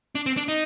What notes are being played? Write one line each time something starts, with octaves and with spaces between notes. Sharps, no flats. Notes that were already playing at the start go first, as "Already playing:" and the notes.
D4
C4
D4
D#4